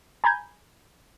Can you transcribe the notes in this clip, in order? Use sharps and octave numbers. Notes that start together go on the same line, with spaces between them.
G#5 A#5 B5 G6 G#6